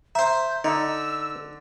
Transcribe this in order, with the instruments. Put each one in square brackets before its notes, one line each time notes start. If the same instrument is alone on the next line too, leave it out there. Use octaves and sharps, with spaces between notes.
[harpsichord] C5 E5 [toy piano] A#5 [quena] G6
[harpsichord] D3 [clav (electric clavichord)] D#4 [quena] E6